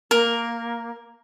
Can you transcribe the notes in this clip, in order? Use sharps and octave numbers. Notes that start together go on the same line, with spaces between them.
A#3 A#4